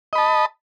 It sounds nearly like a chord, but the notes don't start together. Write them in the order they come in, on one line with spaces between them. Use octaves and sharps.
D#5 B5 A5